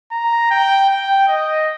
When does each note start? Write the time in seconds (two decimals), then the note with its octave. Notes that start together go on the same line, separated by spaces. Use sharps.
0.12 A#5
0.51 G5
0.90 G5
1.28 D#5